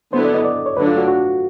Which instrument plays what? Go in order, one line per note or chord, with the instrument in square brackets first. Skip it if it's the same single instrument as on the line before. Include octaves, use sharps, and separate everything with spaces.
[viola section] D3 F#3 B3 E4 [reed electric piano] C5
[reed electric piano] D5
D#5
D5
C#5
[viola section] D3 F#3 A3 D4 [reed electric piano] B4
[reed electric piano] F4
F#4
F#4